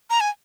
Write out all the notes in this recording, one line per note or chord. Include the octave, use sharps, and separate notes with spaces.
A#5
G#5